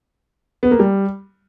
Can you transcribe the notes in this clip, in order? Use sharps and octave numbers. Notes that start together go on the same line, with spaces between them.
B3
A#3
G3